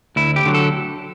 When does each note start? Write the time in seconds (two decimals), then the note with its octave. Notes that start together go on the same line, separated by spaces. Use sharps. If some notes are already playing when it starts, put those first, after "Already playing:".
0.16 D2 E4
0.36 G4
0.45 D3 F#3
0.54 A4